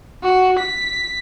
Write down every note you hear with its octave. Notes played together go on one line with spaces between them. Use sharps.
F#4
B6